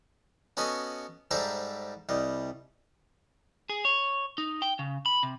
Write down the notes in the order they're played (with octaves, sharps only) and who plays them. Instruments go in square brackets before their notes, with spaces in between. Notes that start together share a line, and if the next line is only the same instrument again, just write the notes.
[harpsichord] B3 C#4 F#4 A4 D#5 G#5
G#2 G3 A4 C5 E5 A#5
C2 G3 D#5
[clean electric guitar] G#4
C#5
D#4
G5
C#3
B5
C3